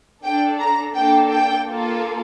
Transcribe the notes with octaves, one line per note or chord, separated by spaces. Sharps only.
D4 A4 G5
A#5
A#3 D4 A4 G5
G5
A#3 F4 A4